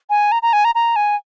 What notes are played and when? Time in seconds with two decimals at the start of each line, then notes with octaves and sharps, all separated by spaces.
0.10 G#5
0.32 A#5
0.42 A#5
0.53 G#5
0.65 A#5
0.75 A#5
0.96 G#5